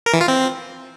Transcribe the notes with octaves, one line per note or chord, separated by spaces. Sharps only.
A#4
E3
F4
C4